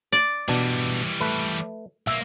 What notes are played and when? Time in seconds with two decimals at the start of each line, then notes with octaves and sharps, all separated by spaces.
0.12 D5
0.48 B2 E3 G3 D4
1.20 A3 B4
2.07 B1 A#3 E5